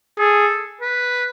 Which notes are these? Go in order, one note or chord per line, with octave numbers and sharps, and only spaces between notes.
G#4 A4
B4